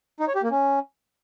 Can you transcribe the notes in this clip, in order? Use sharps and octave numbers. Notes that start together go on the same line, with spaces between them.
D#4
C#5
G4
A#3
C#4